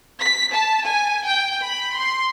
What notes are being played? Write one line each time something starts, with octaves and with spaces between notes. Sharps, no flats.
B6
A5
G#5
G5
B5
C6